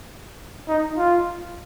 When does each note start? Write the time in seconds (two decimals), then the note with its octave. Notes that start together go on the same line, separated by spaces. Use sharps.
0.68 D#4
0.97 F4